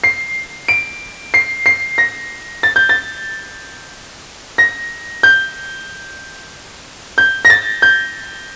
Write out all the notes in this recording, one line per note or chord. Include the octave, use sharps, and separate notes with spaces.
C7
D7
C7
C7
A#6
A6
G6
A6
A#6
G6
G6
A#6
A6
G6